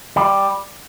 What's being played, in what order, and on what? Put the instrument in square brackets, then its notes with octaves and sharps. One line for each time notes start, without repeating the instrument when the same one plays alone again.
[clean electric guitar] G3